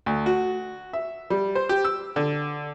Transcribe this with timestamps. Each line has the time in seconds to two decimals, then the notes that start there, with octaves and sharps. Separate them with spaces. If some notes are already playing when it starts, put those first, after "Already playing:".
0.06 D2
0.26 F#4
0.93 E5
1.30 G3
1.55 C5
1.69 G4
1.85 E6
2.16 D3